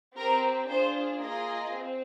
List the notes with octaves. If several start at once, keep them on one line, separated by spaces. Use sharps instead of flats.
C4 G4 A#4
D4 F4 G#4 C5
A#3 F4 G#4 D#5
C4